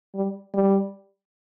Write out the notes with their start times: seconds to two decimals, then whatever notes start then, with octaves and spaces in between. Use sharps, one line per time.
0.14 G3
0.54 G3